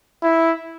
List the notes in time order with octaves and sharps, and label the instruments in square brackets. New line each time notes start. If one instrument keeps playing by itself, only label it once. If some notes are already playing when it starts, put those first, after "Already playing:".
[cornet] E4